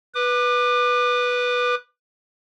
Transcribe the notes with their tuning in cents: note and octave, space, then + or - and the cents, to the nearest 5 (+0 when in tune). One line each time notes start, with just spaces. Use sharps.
B4 -10 D6 +30